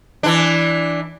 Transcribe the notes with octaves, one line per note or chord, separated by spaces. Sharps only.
E3 D4